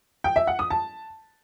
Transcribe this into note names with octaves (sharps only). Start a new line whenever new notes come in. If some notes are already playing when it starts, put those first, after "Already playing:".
G5
E5
F#5
D#6
A5